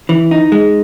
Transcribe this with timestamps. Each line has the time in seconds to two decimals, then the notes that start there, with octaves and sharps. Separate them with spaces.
0.09 E3
0.31 D#4
0.52 G#3